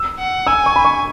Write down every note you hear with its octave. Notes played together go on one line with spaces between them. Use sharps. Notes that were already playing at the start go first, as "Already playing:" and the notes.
Already playing: E6
F#5
G#5 E6
C#6
B5
C#6